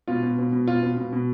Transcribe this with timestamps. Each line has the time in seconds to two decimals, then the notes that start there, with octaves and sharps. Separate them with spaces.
0.08 B2 F4
0.23 B2
0.39 B2
0.52 B2
0.68 B2 F4
0.83 B2
0.97 B2
1.13 B2